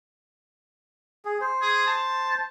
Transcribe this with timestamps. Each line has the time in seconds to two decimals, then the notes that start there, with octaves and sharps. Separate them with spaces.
1.25 G#4
1.41 C5
1.62 G#4
1.87 A5